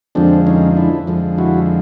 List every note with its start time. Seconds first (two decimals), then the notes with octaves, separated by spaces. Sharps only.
0.15 F2 D3 F3 G#3 C4 D4
0.47 C#4 D#4
0.77 D4 E4
1.07 F2 D3 F3 G#3
1.38 E4 F#4